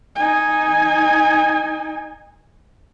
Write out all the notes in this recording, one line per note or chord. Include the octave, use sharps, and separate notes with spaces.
D#4 G#5